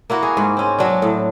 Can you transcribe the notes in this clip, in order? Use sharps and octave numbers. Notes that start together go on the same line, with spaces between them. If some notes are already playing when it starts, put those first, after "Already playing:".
A#3 E4 F#4
G#4
G#2
C4 C#4
F#3 D4
A2